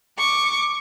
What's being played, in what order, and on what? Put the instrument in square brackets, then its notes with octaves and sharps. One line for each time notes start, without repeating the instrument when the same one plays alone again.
[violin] C#6 [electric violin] D6